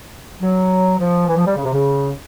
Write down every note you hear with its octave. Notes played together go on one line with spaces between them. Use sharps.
F#3
F3
E3
F3
G3
C#3
C3
C#3